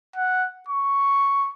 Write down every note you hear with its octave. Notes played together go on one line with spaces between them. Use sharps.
F#5
C#6